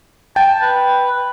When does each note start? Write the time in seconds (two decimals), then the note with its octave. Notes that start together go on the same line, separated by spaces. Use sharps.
0.36 G5 A5
0.62 B4
1.12 B4